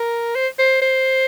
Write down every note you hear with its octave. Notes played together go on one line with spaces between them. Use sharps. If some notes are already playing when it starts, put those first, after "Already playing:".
Already playing: A#4
C5
C5
C5